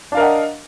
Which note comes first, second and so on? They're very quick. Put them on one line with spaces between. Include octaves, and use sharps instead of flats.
D4 F5 A#4 D#5 F#5